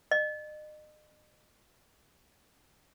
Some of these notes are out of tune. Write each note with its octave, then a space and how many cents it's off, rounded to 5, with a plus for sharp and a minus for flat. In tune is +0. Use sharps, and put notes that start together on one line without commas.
D#5 -35